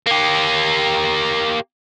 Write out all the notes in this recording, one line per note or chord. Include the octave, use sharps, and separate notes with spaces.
A#3 G4